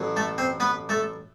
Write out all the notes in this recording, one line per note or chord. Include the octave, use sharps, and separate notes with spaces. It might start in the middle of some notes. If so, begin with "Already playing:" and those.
Already playing: A1 A2 F#3
A3 A4
C4 C5
B3 B4
A3 A4